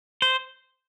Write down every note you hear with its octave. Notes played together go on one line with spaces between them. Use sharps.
C5